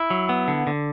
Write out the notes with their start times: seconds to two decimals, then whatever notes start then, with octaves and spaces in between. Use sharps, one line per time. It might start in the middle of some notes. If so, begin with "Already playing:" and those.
Already playing: E4
0.10 F#3
0.29 B3
0.48 D3
0.67 D3